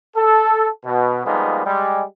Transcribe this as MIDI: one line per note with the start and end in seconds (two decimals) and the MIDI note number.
0.16 0.67 69
0.85 1.25 47
1.25 1.64 53
1.25 1.64 55
1.25 1.64 56
1.25 1.64 58
1.25 1.64 59
1.25 1.64 63
1.65 2.03 55
1.65 2.03 56